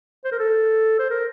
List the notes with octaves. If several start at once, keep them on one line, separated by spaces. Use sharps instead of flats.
C5
A#4
A4
C5
A#4